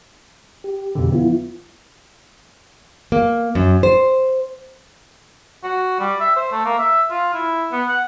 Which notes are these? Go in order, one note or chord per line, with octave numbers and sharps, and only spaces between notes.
G4
F2 B2 D3
F3 B3 E4 F4
A#3
F#2
C5
F#4
G3
E5
C5
A3
A#3
E5
F4
E4
B3
F#5